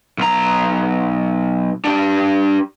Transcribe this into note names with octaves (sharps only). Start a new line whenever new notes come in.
B1 A#5
D4 G4